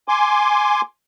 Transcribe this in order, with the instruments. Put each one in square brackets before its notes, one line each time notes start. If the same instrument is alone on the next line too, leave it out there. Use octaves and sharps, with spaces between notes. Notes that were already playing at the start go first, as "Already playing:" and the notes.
[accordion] G#5 C6 D6